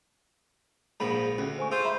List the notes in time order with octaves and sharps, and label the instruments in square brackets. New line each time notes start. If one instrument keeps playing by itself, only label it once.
[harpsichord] A#1 G#2 F3 [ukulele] B5
[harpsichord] D2 [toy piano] C#4
[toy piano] C5 G#5 C#6
[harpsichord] F4 [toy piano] G#4 E6 [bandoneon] C5
[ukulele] E5 B5